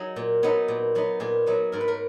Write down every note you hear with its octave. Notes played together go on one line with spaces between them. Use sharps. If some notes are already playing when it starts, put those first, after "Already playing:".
Already playing: F#3 D#4 G#4
A#2
F#3 B3 D#4
A#2
F#3 B3 D#4
A#2 G#4
F#3 B3 D#4
G#2 A#4
B4
A#4